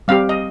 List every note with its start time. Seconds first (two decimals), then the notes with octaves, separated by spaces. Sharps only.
0.08 G3 C4 G4 F5
0.29 D#5